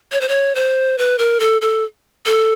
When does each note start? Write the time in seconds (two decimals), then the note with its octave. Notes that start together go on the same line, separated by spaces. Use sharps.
0.12 C#5
0.21 C5
0.29 C#5
0.55 C5
0.98 B4
1.19 A#4
1.40 A4
1.61 A4
2.26 A4